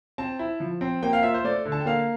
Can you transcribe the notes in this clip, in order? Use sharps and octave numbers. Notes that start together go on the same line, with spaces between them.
C4 A5
E4
F3
C4
A#3 G5
F5
F4 E5
C5
A3 D5
D3
A5
G5
A#3 F5